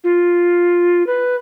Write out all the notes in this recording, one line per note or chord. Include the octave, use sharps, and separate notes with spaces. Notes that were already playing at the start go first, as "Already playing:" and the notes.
F4
B4